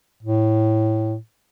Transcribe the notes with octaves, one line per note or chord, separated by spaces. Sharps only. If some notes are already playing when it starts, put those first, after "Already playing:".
A2